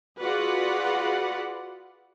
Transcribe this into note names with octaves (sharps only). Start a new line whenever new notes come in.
F4 F#4 G#4 B4 D5 F#5